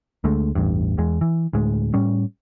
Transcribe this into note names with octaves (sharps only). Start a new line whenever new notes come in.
D2 D3 G#3 A3
A1 E2 G2
E2 G#3
E3
D2 A2 G#3
A2 G3 C#4